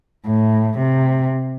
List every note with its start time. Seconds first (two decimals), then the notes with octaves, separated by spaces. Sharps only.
0.27 A2
0.78 C3